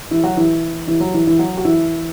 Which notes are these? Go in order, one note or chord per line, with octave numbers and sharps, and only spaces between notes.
E3 E4
F#3 F#4
E3 E4
E3 E4
F#3 F#4
E3 E4
E3 E4
F#3 F#4
F#4
E3 E4